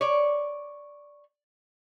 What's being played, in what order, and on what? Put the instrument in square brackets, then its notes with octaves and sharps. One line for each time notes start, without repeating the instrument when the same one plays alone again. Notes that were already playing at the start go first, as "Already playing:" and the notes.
[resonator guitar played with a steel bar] C#5 D5